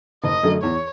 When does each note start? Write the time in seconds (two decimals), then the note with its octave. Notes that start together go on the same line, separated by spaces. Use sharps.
0.24 F#1 D#5
0.43 F#2 D3 F#3 A3
0.62 E2 C#5